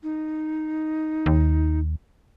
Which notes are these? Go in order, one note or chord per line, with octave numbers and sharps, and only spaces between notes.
D#4
D#2